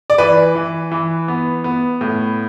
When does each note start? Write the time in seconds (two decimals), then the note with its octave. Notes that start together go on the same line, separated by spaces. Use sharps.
0.10 D5
0.18 E3 B4
0.55 E3
0.91 E3
1.28 B3
1.64 B3
2.01 A2